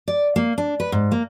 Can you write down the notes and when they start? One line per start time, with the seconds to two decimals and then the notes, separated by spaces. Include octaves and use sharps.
0.08 D5
0.36 A#3
0.58 D4
0.80 B4
0.92 G#2
1.12 A#3